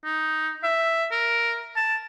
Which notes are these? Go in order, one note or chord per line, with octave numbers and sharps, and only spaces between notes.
D#4
E5
A#4
A5